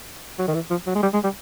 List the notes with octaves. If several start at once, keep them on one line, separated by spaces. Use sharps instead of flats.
F#3
D#3
E3
F3
F#3
G#3
G3
G#3
G3